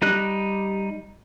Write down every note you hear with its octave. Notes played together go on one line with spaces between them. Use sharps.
G3 D#4 G4 F#6